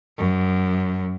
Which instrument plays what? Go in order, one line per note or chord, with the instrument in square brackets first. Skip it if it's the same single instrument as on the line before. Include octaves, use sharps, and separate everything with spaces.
[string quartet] F#2